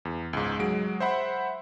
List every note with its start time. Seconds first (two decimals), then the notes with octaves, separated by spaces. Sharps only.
0.05 E2
0.33 C#2 G#2
0.59 F#3 G#3 D7
1.00 C5 E5 F#5 B5